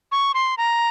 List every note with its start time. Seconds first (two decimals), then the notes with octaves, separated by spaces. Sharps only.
0.12 C#6
0.34 C6
0.58 A#5